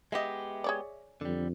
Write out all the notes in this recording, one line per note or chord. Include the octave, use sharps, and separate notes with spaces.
G#3 B3 G4 D#5 E5
G#4 C#5 D5
F2 D3 G3